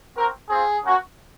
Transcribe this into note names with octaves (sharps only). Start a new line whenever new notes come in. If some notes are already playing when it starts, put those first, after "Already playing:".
C4 F#4 A#4
C4 F4 G#4
A#3 C#4 F#4